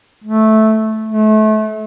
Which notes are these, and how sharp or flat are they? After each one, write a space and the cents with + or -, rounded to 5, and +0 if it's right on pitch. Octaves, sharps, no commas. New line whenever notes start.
A3 -10
A3 -30